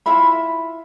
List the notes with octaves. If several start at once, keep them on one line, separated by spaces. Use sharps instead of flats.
E4 F4 E5 B5